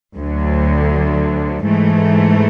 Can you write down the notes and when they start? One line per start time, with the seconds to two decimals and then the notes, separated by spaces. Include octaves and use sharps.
0.17 D2 D3 F#3
1.65 G#2 E3 A3